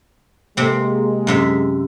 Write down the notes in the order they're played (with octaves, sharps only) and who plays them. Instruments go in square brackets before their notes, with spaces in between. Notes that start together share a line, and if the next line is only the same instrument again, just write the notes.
[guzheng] C3 C4 [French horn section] G#3 [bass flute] A#3
[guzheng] F#2 C3 E5